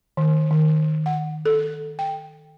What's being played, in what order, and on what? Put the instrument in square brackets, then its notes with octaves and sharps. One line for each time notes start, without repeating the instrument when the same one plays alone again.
[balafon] D#3
D#3
F#5
A4
G5